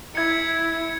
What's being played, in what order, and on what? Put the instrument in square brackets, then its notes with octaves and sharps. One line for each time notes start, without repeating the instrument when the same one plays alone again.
[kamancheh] E4 [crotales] G#6 C#7